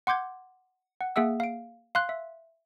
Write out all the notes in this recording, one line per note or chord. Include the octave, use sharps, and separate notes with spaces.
F#5 C6 D6 G6 G#6
F#5
A#3 G#4 E5 F#5 E6
F5 D7
F5 C6 F#6
E5